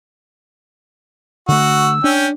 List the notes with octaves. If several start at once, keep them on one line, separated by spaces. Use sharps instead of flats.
D3 A3 F#4 E6
C#4 D4 G5